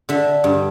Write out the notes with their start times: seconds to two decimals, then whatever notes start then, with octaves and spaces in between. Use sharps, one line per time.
0.09 D3 E5
0.44 G2